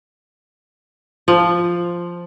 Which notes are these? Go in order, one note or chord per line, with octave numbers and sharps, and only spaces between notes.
F3